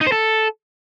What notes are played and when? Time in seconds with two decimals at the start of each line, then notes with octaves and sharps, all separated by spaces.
0.01 D#4
0.07 C5
0.12 A4